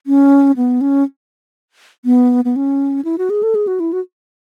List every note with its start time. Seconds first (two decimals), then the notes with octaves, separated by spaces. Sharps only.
0.07 C#4
0.57 B3
0.81 C#4
2.05 B3
2.45 B3
2.56 C#4
3.05 E4
3.18 F#4
3.30 G#4
3.43 A4
3.55 G#4
3.67 F#4
3.80 E4
3.93 F#4